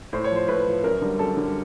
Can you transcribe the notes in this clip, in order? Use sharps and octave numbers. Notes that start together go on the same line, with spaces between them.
A2 C5
C#5
F3
C5
A2 B4
F3
F#2 A#4
D3 G3
F#2 A4
D3 G3